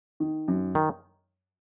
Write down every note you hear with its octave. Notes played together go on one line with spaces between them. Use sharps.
D#3
F#2
D#3